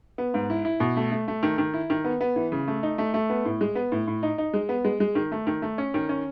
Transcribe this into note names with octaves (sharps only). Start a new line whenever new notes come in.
B3
G#2
E4
E4
B2
A3
A3
A3
D#3
D#3
E4
D#3
B3
B3
E3
C#3
A3
D#4
A3
A3
B3
A2
G#3
B3
A2
A2
D#4
D#4
G#3
B3
G#3
G#3
D#3
A3
D#3
A3
C#4
D#3
C#4